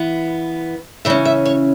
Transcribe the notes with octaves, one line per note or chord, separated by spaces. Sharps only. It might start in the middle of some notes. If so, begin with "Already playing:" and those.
Already playing: E3 B3
C#3 E3 C#4 E5
E5
C#5